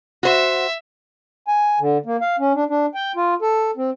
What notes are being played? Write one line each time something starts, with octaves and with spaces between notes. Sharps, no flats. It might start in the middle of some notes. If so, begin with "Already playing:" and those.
F#4 C5 E5
G#5
D3
A#3
F5
C#4
D4
D4
G5
F4
A4
C4